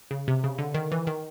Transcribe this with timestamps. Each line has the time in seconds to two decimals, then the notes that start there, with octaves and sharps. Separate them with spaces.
0.11 C#3
0.28 C3
0.44 C#3
0.58 D3
0.74 D#3
0.92 E3
1.07 D#3